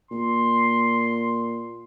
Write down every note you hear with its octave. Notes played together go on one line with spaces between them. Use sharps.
A#2 C6